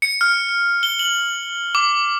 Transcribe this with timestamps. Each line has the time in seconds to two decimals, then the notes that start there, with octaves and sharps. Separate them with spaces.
0.02 C#7
0.21 F6
0.83 G7
0.99 F#7
1.75 D6